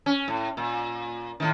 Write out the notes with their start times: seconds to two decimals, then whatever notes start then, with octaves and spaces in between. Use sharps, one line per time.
0.06 C#4
0.28 A2
0.57 A#2
1.40 A2 D#3